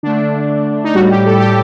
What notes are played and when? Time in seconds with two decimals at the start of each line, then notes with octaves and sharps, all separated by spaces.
0.03 D3 A3 D4
0.84 D#4
0.94 A2 G3 F#4
1.11 G4
1.26 A4
1.40 G4